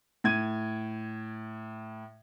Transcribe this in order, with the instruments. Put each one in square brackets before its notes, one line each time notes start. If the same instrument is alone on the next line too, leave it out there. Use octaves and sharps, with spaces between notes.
[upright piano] A2 G#6 D#7